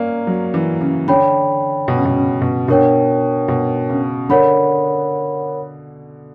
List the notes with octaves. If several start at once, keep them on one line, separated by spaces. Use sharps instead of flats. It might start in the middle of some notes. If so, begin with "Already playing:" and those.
Already playing: A#3 C#4 A#4 D5 A#5
F#3
E3
C#3
D3 C#5 G5 B5
B2
C#3
B2
C#3
B2
B2 D4 A#4 C#5 G5
B2
C#3
D3 A#4 C#5 F#5 B5